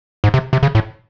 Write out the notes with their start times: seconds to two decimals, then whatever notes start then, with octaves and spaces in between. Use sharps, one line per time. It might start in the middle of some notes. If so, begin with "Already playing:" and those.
0.24 G#2
0.34 C3
0.53 C3
0.63 C#3
0.75 A2